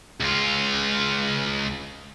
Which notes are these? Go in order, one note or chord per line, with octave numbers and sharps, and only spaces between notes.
C#2 F4